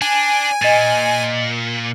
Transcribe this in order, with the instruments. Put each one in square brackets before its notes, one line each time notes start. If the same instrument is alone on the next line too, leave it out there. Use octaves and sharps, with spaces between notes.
[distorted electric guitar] D4 [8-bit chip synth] G#5
[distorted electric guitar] A#2 [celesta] D#5 A6